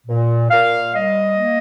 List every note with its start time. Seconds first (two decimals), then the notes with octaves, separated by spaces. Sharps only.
0.07 A#2
0.50 A#2 F5
0.93 G3 D#5
1.36 A#3